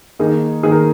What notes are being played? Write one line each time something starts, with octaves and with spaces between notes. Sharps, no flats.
D#3 A#3 D#4 G#4
D#3 A#3 D#4 G#4
A#4